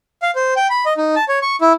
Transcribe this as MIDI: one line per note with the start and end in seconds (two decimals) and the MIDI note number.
0.22 0.31 77
0.35 0.54 72
0.56 0.67 79
0.70 0.85 83
0.86 0.93 75
0.97 1.15 63
1.16 1.24 81
1.29 1.39 73
1.42 1.56 85
1.61 1.73 64